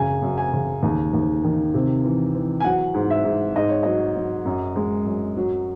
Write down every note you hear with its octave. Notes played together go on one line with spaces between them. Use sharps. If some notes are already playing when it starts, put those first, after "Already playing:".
Already playing: F#2 C#3 G#5
F#2
G#5
C#3
D#2
D#2
D#3
C3
E3
E3
G#5
F#3 F#5
G#2
E5
G#2
G#2 D#5
C#5
F#3 D#5
F#3
F#2
G#3
F#2
F#3